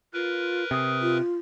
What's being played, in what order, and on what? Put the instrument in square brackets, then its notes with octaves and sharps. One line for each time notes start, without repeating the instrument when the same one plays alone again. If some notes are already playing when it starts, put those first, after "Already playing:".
[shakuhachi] F4 [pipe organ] A#4 B4
[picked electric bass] C3 [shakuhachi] D#6
[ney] F4